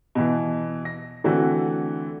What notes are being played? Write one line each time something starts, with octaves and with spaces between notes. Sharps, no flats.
B2 E3
A#6
D3 E3 A3 C4 F#4